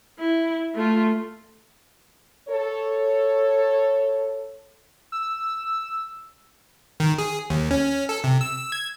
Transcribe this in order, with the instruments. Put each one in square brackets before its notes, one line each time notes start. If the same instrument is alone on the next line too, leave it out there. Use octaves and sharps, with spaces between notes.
[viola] E4
A3 F4
[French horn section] A4 C#5
[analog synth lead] E6
[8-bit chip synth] D#3
G#4
D#2
C#4
A4
C3
E6
G#6